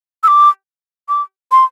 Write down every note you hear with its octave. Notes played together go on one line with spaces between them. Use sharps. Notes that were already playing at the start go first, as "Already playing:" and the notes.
E6
D6
D6
C6